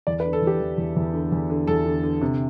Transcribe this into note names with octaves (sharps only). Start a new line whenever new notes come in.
E2 D5
B4
D3
A4
E2
G4
E2
E2
E2
D3
E2
D3
E2 A4
D3
D3
C3